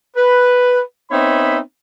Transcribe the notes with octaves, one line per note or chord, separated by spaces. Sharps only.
B4
B3 C4 D#4 C#5 E5 B5